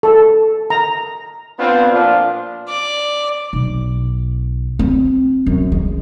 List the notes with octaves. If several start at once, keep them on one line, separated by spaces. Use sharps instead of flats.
A4
A#5
B3 C4 D4 F4
A#2 F3 D4 F4
D5
B1
C4
F#2
G#3